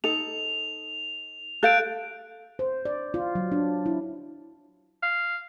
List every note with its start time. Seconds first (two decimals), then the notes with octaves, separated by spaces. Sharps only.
0.04 D#4 A4 F7
1.63 A4 F5 F#6 G6 D7
2.59 C5
2.85 D5
3.14 F4
3.35 F#3
3.52 D4
3.86 E4
5.03 F5